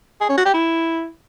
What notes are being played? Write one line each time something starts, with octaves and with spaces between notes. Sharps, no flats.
G#4
C#4
F#4
G4
E4